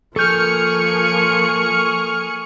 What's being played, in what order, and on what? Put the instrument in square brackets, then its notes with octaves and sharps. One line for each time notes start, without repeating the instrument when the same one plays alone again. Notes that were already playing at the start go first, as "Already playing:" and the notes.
[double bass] F3 A#3 [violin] G#4 C#7 [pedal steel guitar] A4 G6 [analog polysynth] C#6 F6